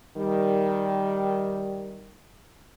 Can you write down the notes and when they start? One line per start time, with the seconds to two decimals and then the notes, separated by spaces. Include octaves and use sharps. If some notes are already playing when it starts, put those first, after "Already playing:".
0.17 D#3 G3